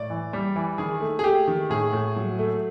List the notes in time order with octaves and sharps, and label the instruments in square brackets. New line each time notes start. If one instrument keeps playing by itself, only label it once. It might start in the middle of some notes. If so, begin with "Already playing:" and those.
Already playing: [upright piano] A2 D5
E3
G3
E3
D#3 G#4
A3
G#4
A3 G4
D#3
A2 G#4
A2
F#3
A3